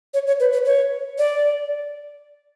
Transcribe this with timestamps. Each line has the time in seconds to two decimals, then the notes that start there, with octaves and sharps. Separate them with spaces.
0.14 C#5
0.27 C#5
0.40 B4
0.53 B4
0.66 C#5
1.18 D5